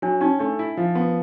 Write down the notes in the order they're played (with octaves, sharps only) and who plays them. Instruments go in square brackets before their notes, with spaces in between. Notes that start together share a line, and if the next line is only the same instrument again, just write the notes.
[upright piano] F#3 [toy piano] D4
[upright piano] C#4 [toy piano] D#4
[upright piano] A3 [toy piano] D4
[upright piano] E4
F3
B3